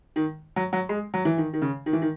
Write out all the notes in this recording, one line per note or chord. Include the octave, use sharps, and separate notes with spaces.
D#3
F#3
F#3
G#3
F#3
E3
D#3
D#3
C#3
D#3
E3
D#3